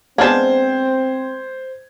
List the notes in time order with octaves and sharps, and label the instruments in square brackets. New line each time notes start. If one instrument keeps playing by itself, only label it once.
[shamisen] G#3 B3 D4 [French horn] C4 [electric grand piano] C5 G#6 [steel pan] F5 A5